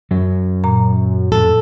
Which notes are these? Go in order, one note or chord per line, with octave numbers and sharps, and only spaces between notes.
F#2 F#3
A#2 A#5
F2 A2 A4